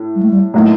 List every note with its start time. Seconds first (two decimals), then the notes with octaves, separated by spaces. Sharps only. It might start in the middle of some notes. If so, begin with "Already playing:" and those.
Already playing: A2
0.16 G3
0.23 A3
0.31 G3
0.54 A2 F#3 A3 A#3 D#4